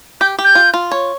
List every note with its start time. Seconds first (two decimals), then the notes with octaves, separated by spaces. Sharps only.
0.21 G4 G6
0.39 G4
0.44 G6
0.55 F4
0.74 F4
0.92 C#5